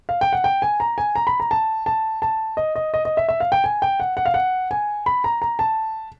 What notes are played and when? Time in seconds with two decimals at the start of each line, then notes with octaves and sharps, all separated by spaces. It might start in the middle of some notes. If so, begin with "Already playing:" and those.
0.09 F5
0.21 G5
0.33 F#5
0.44 G5
0.62 G#5
0.80 A#5
0.98 G#5
1.15 A#5
1.27 B5
1.40 A#5
1.51 A5
1.86 A5
2.22 A5
2.57 D#5
2.76 D#5
2.94 D#5
3.05 D#5
3.17 E5
3.29 E5
3.40 F5
3.52 G5
3.64 G#5
3.82 G5
4.00 F#5
4.17 F#5
4.26 F5
4.34 F#5
4.71 G#5
5.06 B5
5.24 A#5
5.42 A#5
5.59 A5